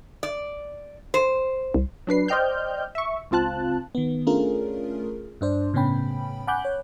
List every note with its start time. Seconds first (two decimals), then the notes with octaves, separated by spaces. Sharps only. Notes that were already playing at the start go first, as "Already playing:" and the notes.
0.23 D5
1.14 C5
1.74 C2
2.07 F#3 D4 B4 C7
2.28 C5 D5 D#5 G5 F6 G6
2.95 E5 C#6
3.31 C#2 C4 F4 A5 F#6
3.95 D#3 B3
4.27 A3 C#4 D4 F4 G#4 A#4
5.41 G2 D4 C5 D5
5.74 A2 C#3 B3 C#4 G5 B5
6.47 F#5 G#5 B5 D6 F#6 G6
6.65 C#5